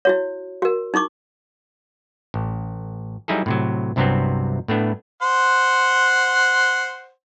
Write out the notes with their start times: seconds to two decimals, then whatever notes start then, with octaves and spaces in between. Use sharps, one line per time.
0.05 E4 F#4 C#5
0.62 F#4 A#4
0.94 D#4 E4 C#6 D6
2.34 A1
3.28 F#3 G3 D#4 E4 G#4 A4
3.46 A2 C3 F#3
3.96 C2 G2 C3 F#3 B3 C4
4.68 A2 A3 B3 D4
5.22 C5 F#5 C6